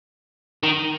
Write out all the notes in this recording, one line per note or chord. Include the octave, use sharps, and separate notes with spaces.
D#3